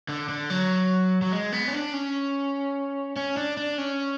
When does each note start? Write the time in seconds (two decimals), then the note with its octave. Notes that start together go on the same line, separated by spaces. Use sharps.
0.09 D3
0.29 D3
0.50 F#3
1.22 F#3
1.32 G#3
1.52 B3
1.68 C#4
1.73 D4
1.93 C#4
3.16 C#4
3.37 D4
3.57 D4
3.78 C#4